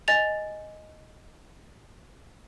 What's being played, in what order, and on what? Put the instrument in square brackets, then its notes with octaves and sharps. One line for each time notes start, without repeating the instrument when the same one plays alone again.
[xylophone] D#5 G#5 A6 F7